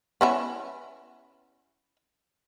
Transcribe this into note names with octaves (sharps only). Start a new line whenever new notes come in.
B3 C#4 E4